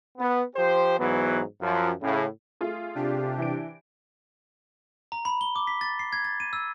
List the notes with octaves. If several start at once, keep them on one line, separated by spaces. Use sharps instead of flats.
B3
F3 G4 C5
G#2 E3 F#3 B3
F#2 F3
A2 C#3
A3 F4 G#4
C3 D4 G4
E3 D7
A#5
B5
G7
D6
B6
A6
C7
G#6
A6
D#7
E6